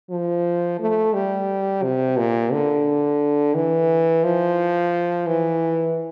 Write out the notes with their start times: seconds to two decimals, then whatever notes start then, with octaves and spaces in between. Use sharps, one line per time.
0.10 F3
0.80 A3
1.14 G3
1.83 C3
2.17 A#2
2.52 D3
3.55 E3
4.24 F3
5.27 E3